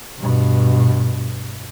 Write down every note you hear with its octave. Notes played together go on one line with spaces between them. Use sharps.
G2 B2